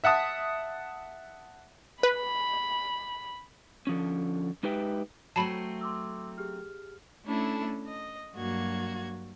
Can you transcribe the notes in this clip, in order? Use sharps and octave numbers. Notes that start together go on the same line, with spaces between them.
E5 F#5 A5 D#6
B4 B5
D3 F3 C#4
G#3 D#4 G4 B4 E5 G5
F#3 A3 C4 A5 B5 C7 C#7 D#7
C6 D6 E6
G4 G#4 F6
A3 C#4 D4 E4 A4
D#5
G2 F#3 A#3 F#4 G#6